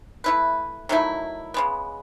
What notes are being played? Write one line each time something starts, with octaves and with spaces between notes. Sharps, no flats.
A3 E4 B4
D#3 F#3 A3 E4
C#3 G#3 B3